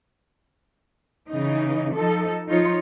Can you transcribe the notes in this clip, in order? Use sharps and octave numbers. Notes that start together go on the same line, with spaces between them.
C#3 E3 D#4
F3 D#4 A4
F3 D#4 F4 C#5